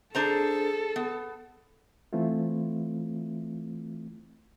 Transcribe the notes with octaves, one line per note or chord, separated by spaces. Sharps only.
D4 G#4 A4 C5 A#5
B3
E3 A3 C4 E4 F4